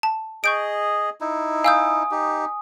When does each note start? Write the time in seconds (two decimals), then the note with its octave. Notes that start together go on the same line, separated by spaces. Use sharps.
0.03 A5
0.44 G#4 D#5 C#6 G6 D7
1.21 D#4 E4
1.64 F5 G#5 D#6 E6 G6
2.11 D#4 G4